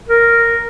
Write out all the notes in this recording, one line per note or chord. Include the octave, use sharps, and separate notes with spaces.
A#4